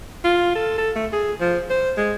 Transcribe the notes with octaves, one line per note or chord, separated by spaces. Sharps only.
F4
A4
A4
A3
G#4
F3
C5
G#3